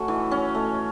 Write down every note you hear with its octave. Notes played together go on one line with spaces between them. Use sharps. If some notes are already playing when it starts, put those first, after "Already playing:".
Already playing: A3 C#4 F#4
E3
C#4
A3